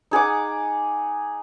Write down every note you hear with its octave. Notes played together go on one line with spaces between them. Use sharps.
D#4 G#4 F#5 D6